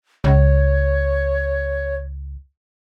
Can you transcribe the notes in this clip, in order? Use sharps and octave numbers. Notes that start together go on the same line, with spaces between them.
C#2 C#5